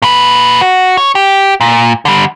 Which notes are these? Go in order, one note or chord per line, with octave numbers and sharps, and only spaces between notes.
A#2 B4
F#4
C#5
G4
A#2
D3 G3